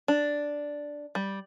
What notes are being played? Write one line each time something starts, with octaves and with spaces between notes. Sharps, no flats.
D4
G3